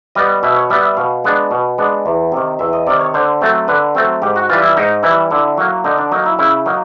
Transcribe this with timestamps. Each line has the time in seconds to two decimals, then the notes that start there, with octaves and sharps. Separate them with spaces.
0.15 G3 B3 D#5
0.43 B2 E5
0.56 C#5
0.70 G3 B3 E5
0.83 E5
0.97 B2 F5
1.24 G#3 B3 D4
1.51 B2
1.78 G#3 B3 D4
2.06 E2
2.32 C3 D#3
2.59 E2 E5
2.73 D#5
2.87 C3 D#3 D5
3.00 C#5
3.14 D3 C5
3.41 F#3 A3 C4
3.68 D3 B4
3.95 F#3 A3 C4
4.22 G#2 G4
4.36 F#4
4.49 E3 G3 F4
4.63 E4
4.77 G#2 D#4
5.03 E3 G3 E4
5.30 D3 E4
5.57 F#3 A#3
5.84 D3 D#4
5.98 D4
6.12 F#3 A#3 D#4
6.26 E4
6.39 C#3 E4
6.66 F#3 A#3 D#4